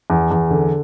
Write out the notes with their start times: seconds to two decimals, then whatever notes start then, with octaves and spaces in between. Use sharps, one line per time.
0.10 E2
0.31 E2
0.51 D3